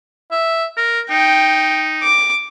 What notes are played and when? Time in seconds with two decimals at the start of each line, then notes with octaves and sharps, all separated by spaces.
0.31 E5
0.77 A#4
1.10 D#4 G5
2.03 D6